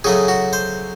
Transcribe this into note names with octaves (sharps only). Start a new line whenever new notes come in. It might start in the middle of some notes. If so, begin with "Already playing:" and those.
C#3 F#3 A3 G#4
F#4
C5